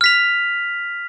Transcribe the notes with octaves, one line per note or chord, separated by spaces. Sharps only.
F6 B6 F7